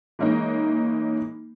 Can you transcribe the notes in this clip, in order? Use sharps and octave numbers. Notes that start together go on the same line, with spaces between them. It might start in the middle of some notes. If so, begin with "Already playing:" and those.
E3 G#3 A#3 C#4 D#4